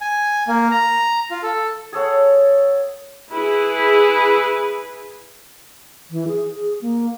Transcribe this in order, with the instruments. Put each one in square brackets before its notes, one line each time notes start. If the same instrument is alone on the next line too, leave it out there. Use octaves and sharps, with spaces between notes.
[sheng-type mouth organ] G#5
A#3
A#5
F4
A4
[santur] G#4 A4 C#5 F#5
[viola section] E4 G#4 B4
[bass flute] E3
G#4
G#4
A#3